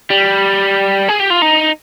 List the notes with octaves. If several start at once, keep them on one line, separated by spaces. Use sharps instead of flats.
G3
G#4
G4
F4
D#4